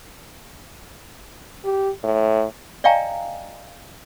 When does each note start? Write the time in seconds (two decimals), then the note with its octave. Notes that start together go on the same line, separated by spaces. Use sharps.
1.64 G4
2.04 A2
2.84 D5 D#5 F5 G5 G#5 A#5